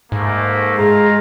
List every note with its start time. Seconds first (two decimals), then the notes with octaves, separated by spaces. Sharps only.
0.12 G#2 A3 A#3
0.77 G#3 F4 G#4 F5 A#5